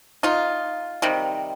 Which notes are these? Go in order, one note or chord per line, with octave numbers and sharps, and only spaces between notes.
D#4 F4
C3 D#3 G3